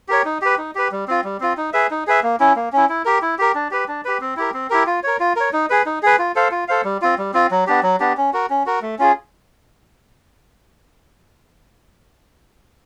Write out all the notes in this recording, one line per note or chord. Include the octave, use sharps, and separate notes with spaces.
G4 A#4 C#5
D#4
G4 B4
D#4
G4 B4
G3
C4 F4
G3
C4 F4
D#4
G#4 B4 E5
D#4
G#4 B4 E5
A#3
C#4 E4
A#3
C#4 E4
E4
G4 A#4
E4
G4 A#4
D4
G4 B4
D4
G4 B4
C4
E4 G4 A#4
C4
E4 G4 A#4
F4
A#4 C#5
F4
A#4 C#5
D#4
G#4 B4
D#4
G#4 B4
F4
A4 C5 F5
F4
A4 C5 F5
G3
C4 F4
G3
C4 F4
F#3
B3 D4 G4
F#3
B3 D4 G4
C#4
F#4 A#4
C#4
F#4 A#4
A3
C#4 F4 G#4